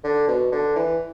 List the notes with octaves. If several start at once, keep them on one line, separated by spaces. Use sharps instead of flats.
D3
B2
D3
E3